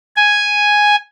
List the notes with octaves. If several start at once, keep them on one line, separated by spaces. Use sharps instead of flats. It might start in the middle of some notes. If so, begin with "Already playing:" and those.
G#5